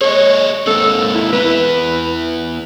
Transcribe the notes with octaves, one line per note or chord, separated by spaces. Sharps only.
G#4 A4 C#5 D#5
G#3 A#3 C4 A4
E4
B3 E4 B4